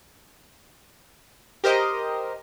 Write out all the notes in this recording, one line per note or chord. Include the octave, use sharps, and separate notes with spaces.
G4 A#4 C5 D#5